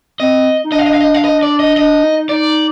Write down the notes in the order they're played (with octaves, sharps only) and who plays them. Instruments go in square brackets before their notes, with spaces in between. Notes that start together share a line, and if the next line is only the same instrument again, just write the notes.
[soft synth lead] C4 [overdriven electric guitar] D#5
[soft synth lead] D#4
[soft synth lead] D4 [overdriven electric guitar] D#5
[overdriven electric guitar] F5
D#5
F5
D#5
F5
D#5
D5
D#5
[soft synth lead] D4 [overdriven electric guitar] D#5
[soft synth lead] D#4
[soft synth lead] D#4 [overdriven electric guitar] D5